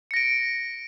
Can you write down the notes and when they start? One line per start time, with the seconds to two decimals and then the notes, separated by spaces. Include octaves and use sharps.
0.11 C#7
0.14 A#6
0.17 D7